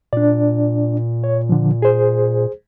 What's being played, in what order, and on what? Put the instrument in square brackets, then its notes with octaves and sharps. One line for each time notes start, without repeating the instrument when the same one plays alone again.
[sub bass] A#2 [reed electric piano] D4 D5
[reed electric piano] C#5
D3 F3
G#4 C5